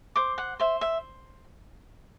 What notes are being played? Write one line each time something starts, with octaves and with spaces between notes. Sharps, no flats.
C5 D6
F#5
C5 E5
E5